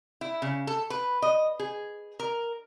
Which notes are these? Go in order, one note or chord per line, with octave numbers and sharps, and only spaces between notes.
E4
C#3
A4
B4
D#5
G#4
A#4